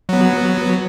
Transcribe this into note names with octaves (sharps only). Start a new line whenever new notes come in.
F#3 B3